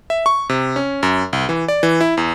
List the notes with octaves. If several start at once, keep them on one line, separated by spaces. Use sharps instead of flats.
E5
C#6
C3
C#4
F#2
C2
E3
D5
E3
E4
E2